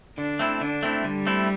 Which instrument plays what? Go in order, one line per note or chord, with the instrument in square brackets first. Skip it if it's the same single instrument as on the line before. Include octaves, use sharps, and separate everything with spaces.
[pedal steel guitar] D3 [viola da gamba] D4
[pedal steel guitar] A3 C4 E4
[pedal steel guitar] D3 [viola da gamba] D4
[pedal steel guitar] A3 C4 E4
[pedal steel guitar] D3 [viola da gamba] G3
[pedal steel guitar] A3 C4 E4